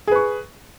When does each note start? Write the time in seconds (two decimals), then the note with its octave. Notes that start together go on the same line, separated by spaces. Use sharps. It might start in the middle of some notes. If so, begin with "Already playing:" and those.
0.07 G#4
0.12 B4
0.16 C#6